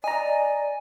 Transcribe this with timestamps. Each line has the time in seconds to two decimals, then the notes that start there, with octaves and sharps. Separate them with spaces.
0.04 D5 D#5 G#5 A#5